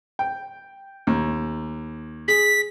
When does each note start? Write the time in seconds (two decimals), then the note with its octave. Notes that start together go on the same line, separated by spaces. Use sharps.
0.19 G5
1.07 D#2
2.28 G#4 B6